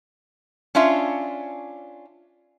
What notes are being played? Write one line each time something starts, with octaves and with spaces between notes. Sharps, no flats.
C#4 D4 F4 E5